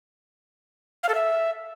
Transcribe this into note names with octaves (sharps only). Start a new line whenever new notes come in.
F5
A4
E5